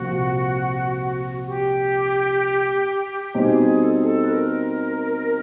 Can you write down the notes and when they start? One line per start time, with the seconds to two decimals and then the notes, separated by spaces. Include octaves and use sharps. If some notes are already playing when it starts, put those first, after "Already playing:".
Already playing: C2 A#2 F3 F#4
1.44 G4
3.34 B2 G3 C4 D#4 G#4
3.81 A4
3.92 G#4
4.03 A4
4.21 B4
4.29 A#4